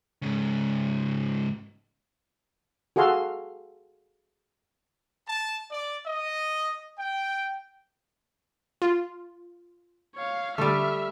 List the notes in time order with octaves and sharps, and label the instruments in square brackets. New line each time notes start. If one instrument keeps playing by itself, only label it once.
[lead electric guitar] G#2 C#3
[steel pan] F#4 G#4 A4 F5 C6
[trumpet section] A5
D5
D#5
G5
[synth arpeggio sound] F4
[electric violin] C#5 F5
[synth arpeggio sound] D3 [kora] G3 A3 [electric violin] E5 F6